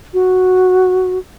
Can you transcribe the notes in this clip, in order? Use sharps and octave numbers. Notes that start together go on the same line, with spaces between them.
F#4